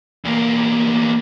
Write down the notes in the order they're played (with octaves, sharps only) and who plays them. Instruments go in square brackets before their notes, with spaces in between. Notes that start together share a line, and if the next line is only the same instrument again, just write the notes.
[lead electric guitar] E2 A#3